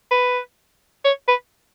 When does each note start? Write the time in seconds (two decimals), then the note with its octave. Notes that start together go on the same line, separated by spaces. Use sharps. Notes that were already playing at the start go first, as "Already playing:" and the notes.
0.11 B4
1.05 C#5
1.28 B4